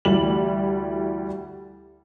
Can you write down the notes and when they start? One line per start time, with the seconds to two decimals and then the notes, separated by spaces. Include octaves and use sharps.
0.05 D2 E3 G3 F#7